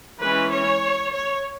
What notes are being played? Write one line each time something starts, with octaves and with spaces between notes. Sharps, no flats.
E3 G#3 C#4 B4
C#5
C#5